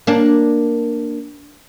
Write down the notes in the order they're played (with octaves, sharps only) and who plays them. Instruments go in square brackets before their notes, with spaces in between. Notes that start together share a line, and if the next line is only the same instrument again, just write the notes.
[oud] A#3 D4